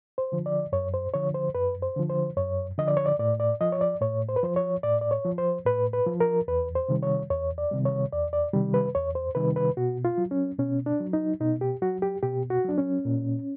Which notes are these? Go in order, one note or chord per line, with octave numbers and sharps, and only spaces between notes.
C5
D3 F3
D5
F#2 C#5
C5
D3 F3 C#5
C5
F#2 B4
C5
D3 F3
C5
F#2 C#5
D3 F3 D#5
D5
C#5
D5
A2 D5
D5
F3 D#5
C#5
D5
A2 C#5
C5
B4
F3 C5
C#5
A2 D5
D5
C#5
F3
C5
A2 B4
B4
F3
A#4
E2 B4
C5
C3 D#3 G3
C#5
E2 C#5
D5
C3 D#3 G3
C#5
E2 D5
D5
C3 D#3 G3
B4
E2 C#5
C5
C3 D#3 G3 B4
B4
B2 F#4
F4
F#3
C#4
B2 C#4
D4
F#3
D#4
B2 D#4
G4
F#3 F#4
G4
B2 G4
F#4
F#3 D4
C#4
A#2